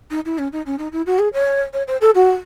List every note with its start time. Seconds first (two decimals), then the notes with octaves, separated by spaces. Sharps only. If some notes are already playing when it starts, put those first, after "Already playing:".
0.11 D#4
0.25 E4
0.38 C#4
0.52 D#4
0.66 C#4
0.78 D#4
0.92 E4
1.06 F#4
1.19 G#4
1.33 C#5
1.73 C#5
1.88 C5
2.01 A4
2.15 F#4